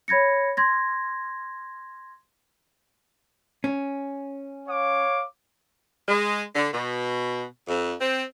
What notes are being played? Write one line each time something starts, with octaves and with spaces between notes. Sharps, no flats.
C#5 B5 G#6 A#6 C#7
C6 G#6 A#6
C#4
C#5 F5 D6
G#3
D3
B2
F2
C4